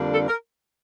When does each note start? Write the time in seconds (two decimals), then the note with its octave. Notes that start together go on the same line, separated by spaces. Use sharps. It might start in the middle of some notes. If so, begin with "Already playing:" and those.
Already playing: F2 D3 G3 A#3 D4
0.13 A4
0.28 A#4